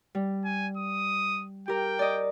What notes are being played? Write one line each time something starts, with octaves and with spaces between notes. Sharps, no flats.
G3
G#5
D#6
G4 A#4 G5
D5 D#5